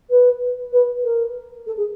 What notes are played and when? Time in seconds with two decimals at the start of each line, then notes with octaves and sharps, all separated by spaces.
0.10 B4
0.72 B4
1.04 A#4
1.66 A4
1.77 G#4